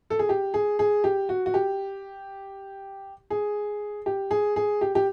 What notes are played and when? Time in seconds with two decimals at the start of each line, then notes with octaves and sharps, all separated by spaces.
0.10 A4
0.19 G#4
0.29 G4
0.54 G#4
0.79 G#4
1.04 G4
1.29 F#4
1.46 F#4
1.54 G4
3.30 G#4
4.06 G4
4.31 G#4
4.56 G#4
4.81 G4
4.95 G4